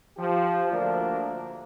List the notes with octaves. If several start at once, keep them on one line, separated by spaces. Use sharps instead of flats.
F3 G4
D2 F3 A#3 D4 A#4